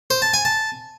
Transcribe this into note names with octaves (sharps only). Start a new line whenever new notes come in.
C5
A5
G#5
A5